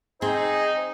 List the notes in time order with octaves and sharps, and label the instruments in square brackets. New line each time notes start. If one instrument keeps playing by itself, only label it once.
[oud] C4 [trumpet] D#4 [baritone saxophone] G#4 [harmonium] C5